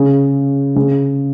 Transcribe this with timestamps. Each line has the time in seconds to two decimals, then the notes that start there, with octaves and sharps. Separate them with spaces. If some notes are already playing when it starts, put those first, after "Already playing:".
Already playing: C#3
0.76 C#3